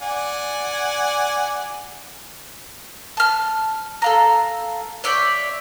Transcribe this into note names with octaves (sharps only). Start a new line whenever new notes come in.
D5 F#5 G#5
A5 F6
A4 F5 A#5
C#5 D5 E5 G5